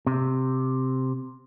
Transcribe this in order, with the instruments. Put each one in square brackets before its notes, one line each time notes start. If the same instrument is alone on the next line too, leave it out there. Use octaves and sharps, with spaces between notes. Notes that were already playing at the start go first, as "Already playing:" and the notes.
[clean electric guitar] C3